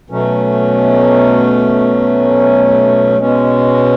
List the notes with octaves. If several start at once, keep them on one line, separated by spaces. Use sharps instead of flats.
B2 F#3 A3 C#4
B2 G#3 C#4